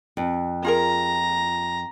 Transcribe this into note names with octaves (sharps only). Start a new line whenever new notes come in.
F2
F4 G#4 A#4 A#5